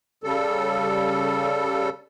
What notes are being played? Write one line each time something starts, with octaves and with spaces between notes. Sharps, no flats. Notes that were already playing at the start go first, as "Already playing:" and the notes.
C#3 G3 A4